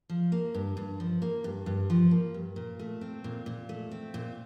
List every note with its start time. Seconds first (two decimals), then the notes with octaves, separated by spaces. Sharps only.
0.10 F3
0.32 A#3
0.54 G2
0.77 G2
1.00 F3
1.22 A#3
1.44 G2
1.66 G2
1.90 F3
2.11 A#3
2.34 G2
2.56 A#2
2.79 A3
3.01 C4
3.24 A#2
3.46 A#2
3.69 A3
3.91 C4
4.14 A#2